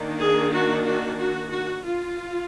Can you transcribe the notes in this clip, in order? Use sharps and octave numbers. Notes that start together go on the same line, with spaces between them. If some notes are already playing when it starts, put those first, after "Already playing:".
Already playing: D#3 A#3 D4
G#4
F#4
F#4
F#4
F#4
F4